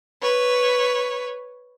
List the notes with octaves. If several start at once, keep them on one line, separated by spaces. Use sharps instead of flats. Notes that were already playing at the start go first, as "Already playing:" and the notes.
B4 C#5